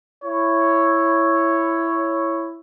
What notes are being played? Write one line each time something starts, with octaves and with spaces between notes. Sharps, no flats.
E4 C#5